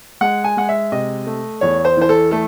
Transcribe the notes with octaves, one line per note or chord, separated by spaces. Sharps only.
G#3 F#5
G#5
G#3 F#5
E5
C3 D#5
A3
E2 C#5
C5
E3 C5
A4
A3 A4